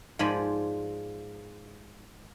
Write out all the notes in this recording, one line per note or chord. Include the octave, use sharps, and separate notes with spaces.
G#2 F3 D5 G#5 B5